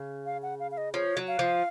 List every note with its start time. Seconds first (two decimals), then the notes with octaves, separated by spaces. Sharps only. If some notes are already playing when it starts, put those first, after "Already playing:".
Already playing: C#3
0.26 F5
0.43 F#5
0.60 F5
0.71 F5
0.77 D#5
0.94 F3 C#5
1.17 F#3
1.28 F5
1.39 F3